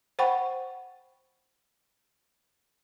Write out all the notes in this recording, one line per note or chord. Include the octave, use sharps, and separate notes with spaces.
C5 F#5 G5 B5 C#6